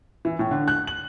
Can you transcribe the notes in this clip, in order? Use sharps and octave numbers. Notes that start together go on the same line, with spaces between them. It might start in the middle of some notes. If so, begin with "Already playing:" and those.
E3
A2
D3
F#6
F#7